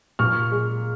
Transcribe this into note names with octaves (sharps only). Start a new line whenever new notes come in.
A#2 C#6 F6
G#3